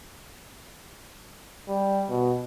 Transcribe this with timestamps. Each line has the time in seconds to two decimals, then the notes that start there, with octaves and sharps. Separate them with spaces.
1.68 G3
2.09 B2